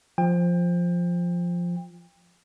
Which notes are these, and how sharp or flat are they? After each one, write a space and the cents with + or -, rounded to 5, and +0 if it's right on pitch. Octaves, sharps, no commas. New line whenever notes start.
F3 +0 G5 +30